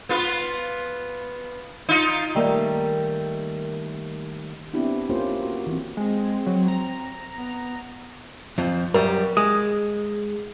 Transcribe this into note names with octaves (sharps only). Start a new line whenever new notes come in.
B3 F4 B4
D#4 F4
D#3 G3 A3 A#3
B3 C4 D4 E4 G4
A#3 C#4 F4 G4 C5
F#4
E3 C4
G#3 C4
F#3
A#5
B3
F2 F3
F#2 G3 A#4
G#3 D#6